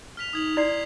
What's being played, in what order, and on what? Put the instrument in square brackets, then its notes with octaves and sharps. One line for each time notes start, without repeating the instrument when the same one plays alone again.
[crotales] F6 B6 F7
[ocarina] D#4 [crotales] D#6 G#6 F#7
[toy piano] E4 D5 C6 [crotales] G#6 C7